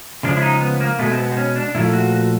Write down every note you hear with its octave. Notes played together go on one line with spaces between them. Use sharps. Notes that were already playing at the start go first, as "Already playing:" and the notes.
C#3 F3 G#3 D4
E4
D#4
B3
A#3
B2 G#3 A3
C4
B3
C4
C#4
D4
A#2 F3 A3 E4
F#4
F#4